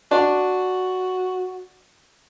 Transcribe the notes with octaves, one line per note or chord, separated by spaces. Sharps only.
D4 F#4